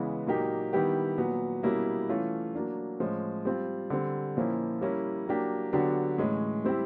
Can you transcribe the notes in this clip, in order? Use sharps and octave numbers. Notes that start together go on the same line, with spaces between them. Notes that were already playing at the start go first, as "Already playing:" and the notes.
Already playing: C#3 E3 G#3 B3
A#2 F#3 A#3 D#4 G4
D#3 G3 B3 E4 G4
A#2 F#3 B3
B2 G3 A#3 C#4 E4
E3 A3 C#4 F4
F#3 A#3 D4
A2 F3 G#3 C#4
G3 C4 F4
D3 G3 C4
A#2 F3 A#3 C#4 E4
G3 A#3 C#4 E4
F#3 A#3 D4 G4
D3 F#3 B3 D4 G4
A2 E3 G#3 C#4
G3 C4 E4 G4